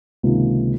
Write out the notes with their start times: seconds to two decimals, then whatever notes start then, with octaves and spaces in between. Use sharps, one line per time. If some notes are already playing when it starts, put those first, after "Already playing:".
0.23 C#2 C3 D#3 A#3